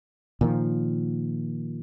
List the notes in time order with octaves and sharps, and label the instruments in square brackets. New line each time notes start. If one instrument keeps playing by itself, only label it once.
[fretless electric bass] A#2 D#3 F3